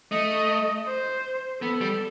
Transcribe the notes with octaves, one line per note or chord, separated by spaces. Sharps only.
A3 D#5
C5
B3 A4
G3